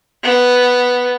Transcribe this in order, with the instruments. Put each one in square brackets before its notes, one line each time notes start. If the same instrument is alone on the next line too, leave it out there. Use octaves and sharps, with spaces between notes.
[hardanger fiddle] B3